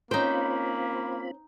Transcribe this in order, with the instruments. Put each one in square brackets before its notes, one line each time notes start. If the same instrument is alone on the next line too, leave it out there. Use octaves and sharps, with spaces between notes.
[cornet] A#3 [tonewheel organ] C4 F4 B5 [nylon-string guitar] C#4 C5 [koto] D#4 G5